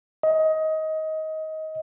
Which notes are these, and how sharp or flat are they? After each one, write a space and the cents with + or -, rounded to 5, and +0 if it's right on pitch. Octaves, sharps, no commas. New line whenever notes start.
D#5 +20